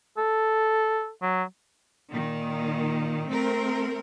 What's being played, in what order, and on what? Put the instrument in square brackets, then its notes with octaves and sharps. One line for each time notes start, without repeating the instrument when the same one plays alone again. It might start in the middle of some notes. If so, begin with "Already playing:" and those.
[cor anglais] A4
F#3
[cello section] A#2 D#3
A3 C4 A#4